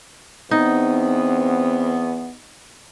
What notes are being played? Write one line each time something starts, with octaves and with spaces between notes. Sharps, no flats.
E2 B3 C4 D#4